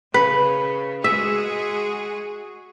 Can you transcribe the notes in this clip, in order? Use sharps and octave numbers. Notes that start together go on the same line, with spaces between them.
C#3 B4
G#3 F#4 G#4 E5